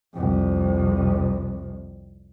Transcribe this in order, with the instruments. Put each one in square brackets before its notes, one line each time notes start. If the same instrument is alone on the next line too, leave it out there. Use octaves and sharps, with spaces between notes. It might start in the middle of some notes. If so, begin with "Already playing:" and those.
[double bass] C2 F2